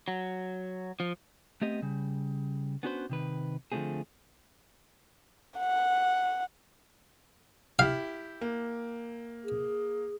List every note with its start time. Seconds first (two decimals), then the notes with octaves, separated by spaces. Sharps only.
0.08 F#3
1.00 F3
1.62 A3 B3 C4 G4 D#5
1.82 C#3 G3
2.83 B3 C#4 D4 F#4 B4 C5
3.09 C3 D#3 B4
3.72 D3 F3 G3 A3 C4 G#4
5.59 F#5
7.79 E4 G4 F5
8.41 A#3
9.44 G#4